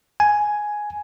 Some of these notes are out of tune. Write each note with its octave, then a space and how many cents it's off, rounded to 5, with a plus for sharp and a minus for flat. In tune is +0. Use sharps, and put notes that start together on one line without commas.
G#5 +5